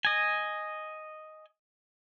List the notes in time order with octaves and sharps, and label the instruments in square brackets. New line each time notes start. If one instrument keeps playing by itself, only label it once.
[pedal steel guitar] D#5 G#5